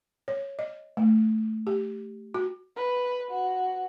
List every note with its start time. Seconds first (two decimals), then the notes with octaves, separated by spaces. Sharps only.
0.28 C#5
0.59 D#5
0.97 A3
1.67 G4
2.34 F#4
2.77 B4
3.31 F#4